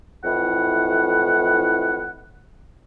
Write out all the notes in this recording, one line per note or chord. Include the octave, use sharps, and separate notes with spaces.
F2 A2 E3 F#5